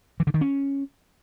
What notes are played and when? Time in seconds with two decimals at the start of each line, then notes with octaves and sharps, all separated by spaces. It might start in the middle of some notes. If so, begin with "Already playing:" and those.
0.20 E3
0.27 D3
0.34 D#3
0.41 C#4